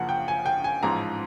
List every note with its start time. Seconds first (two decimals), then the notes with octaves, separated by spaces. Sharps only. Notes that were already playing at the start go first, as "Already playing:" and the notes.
Already playing: F#2 C#3 F3 A#3 F#5
0.09 G5
0.28 G#5
0.46 G5
0.64 G#5
0.83 A1 G#2 F3 A#5